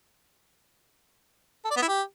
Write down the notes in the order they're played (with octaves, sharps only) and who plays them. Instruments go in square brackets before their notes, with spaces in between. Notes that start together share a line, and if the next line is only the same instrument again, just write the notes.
[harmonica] A4
D5
B3
E4
G4